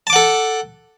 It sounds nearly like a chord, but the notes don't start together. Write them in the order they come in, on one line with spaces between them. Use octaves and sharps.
A5 D6 F#5 A4